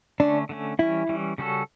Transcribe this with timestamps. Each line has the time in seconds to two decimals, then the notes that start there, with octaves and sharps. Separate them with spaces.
0.20 D3 A3 C#4 D4
0.49 D3 A3 C#4
0.79 E3 G3 C#4 E4
1.09 E3 G3 C#4
1.38 C#3 G3 C#4 F#4 A4